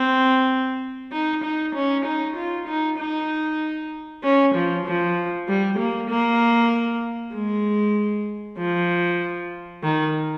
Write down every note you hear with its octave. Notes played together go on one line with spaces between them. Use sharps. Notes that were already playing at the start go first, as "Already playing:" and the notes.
Already playing: C4
D#4
D#4
C#4
D#4
F4
D#4
D#4
C#4
F3
F3
G3
A#3
A#3
G#3
F3
D#3